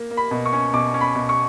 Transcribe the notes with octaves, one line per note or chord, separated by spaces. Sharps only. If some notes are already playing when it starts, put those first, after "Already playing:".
Already playing: A#3
A#3
B5
B2
C#6
C#4
B2 D6
C#4
B5
B2
C#6